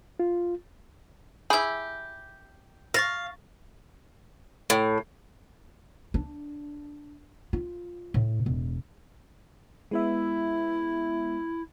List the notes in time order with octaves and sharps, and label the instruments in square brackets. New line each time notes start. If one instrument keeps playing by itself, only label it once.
[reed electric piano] F4
[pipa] E4 G4 [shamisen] G#4 [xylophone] B5 G6
[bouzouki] F5 [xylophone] C#6 A6 A#6
[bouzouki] A2
[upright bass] D4
F4
A2
E1
[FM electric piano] G#3 B3 E5 [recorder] E4